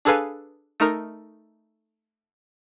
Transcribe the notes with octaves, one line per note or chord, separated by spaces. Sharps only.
D4 G#4 A4 B4 F5 G#5
A3 D#4 A#4